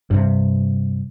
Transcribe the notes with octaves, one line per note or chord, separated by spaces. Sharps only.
G2 C3